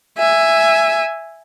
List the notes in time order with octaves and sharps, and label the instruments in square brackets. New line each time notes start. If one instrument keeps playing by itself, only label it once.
[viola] E5 G#5